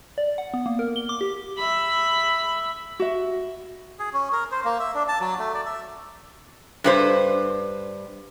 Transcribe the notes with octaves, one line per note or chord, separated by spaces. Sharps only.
D5
F#5
B3
A#3
A#4
G7
D6
G4
E5 B5
F#4 E5
G#4
C#4
A#4
C5
A#3
E5
D4
A5
F#3
A3
D5
E5
G2 B4 C5